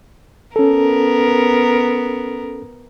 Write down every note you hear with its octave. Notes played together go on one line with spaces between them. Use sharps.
B3 C#4 A4 A#4